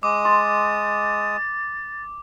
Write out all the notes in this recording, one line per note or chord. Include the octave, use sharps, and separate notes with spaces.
G#3 D6 D#6
C6 A6